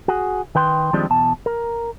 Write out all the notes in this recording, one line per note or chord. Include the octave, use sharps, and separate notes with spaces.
F#4 G#4
D#3 B4 G5 C6
D#3 F3 G3 G#3 C4 D4
E2 B2 A5
A#4